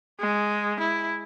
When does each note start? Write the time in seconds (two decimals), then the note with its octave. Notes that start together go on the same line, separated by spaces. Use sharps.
0.20 G#3
0.80 E4